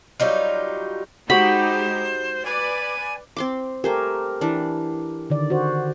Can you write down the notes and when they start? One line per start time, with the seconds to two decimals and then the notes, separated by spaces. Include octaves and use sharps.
0.20 F#3 G3 D#4 F4
1.30 G#3 D#4 F#4 G4 C5 F#5 B5
2.45 B4 D5 G#5
3.36 C4 C6 D6
3.84 A3 G4 A#4 C5 G#5
4.41 E3 D4
5.30 D3 D#3 D5
5.50 F#4 C5